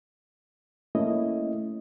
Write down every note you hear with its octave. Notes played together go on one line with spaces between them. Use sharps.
A3 A#3 C#4 E4 D#5